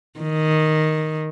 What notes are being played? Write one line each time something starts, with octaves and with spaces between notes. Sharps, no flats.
D#3